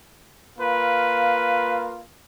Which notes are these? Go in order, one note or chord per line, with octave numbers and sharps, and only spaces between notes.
A#3 F4 B4 F5